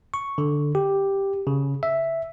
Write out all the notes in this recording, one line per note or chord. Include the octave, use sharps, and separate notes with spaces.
C#6
D3
G4
C#3
E5